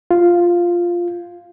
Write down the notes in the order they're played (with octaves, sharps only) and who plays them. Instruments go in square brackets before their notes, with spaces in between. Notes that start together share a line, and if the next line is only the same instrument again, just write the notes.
[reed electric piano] F4